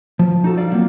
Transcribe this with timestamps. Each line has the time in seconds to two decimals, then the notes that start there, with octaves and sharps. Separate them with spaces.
0.19 F3
0.44 D#4 F#4 A4
0.57 G3 D5 F5
0.72 F#3 A#3 C4 F4